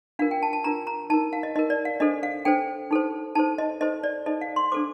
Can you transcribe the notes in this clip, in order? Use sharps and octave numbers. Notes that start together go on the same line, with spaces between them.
D4 F4 A#4 F5
G5
A5
A5
D4 F4 A#4 A#5
A#5
D#4 A#4 A5
F5
D#5
D#4 A#4 D#5
D5
F5
D4 A4 C5 D#5
F5
D4 A4 C5 G5
D#4 A4 C5
D#4 A4 C5 A5
D#5
D#4 A4 C5 D#5
D5
D#4 A4 C5 D#5
F5
C6
D4 A4 C5 D6